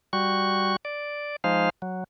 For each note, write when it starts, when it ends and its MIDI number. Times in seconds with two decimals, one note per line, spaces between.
0.13 0.76 55
0.13 0.76 66
0.13 0.76 85
0.85 1.36 74
1.44 1.70 53
1.44 1.70 56
1.44 1.70 63
1.44 1.70 72
1.44 1.70 77
1.82 2.04 54